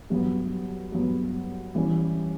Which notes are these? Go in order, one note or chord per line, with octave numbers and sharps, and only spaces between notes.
G2 F#3 B3
G2 F#3 B3
E3 G3 C#4